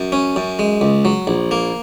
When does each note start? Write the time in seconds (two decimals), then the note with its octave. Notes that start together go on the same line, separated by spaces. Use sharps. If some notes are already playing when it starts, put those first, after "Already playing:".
Already playing: F#2
0.12 C#4
0.36 F#2
0.59 G#3
0.81 C#2
1.05 F#3
1.27 A#1
1.51 A#3